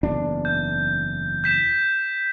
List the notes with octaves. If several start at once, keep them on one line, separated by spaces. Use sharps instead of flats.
F#1 E2 D4
G6
G6 B6 E7